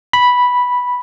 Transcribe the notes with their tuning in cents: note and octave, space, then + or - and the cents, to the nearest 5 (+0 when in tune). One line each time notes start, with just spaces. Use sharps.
B5 -5